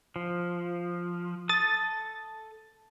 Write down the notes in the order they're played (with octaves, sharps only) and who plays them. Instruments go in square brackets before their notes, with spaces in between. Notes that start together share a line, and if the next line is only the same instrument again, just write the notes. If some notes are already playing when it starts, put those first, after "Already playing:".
[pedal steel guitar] F3
[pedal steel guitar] A4 D#6 [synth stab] A6